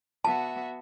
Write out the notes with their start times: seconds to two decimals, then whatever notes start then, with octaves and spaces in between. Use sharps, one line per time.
0.25 B3 F#4 E5 A5